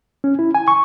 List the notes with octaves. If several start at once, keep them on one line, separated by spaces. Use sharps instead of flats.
C#4
E4
G#5
C#6